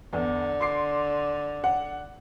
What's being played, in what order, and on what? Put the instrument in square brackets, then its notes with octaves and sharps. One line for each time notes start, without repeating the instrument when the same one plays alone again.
[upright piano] E2 [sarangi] D3
[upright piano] C6 D6 C7
F#5